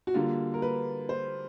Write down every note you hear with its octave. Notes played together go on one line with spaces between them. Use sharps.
F#4
D3 G3 A#3 F4
A#4
B4
C5